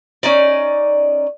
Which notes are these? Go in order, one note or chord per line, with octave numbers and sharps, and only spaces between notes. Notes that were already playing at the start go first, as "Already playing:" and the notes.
C#4 D#4 D5